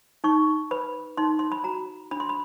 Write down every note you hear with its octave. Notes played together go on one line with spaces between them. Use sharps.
D#4 C#6
B4 B5
D#4 C6
C6
B5
F#4 A#5
D4 B5
C6
B5